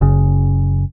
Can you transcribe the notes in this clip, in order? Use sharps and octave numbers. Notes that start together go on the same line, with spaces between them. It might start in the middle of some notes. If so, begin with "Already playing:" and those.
F#1 C#3